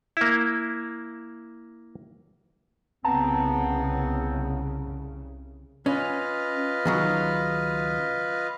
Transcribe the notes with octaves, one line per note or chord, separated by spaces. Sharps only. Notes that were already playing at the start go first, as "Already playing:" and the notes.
A#3 E4
C2 C#3 B3 C4 A5 A#5
C#4 F4 B4 D#5
C#2 D#3 F#3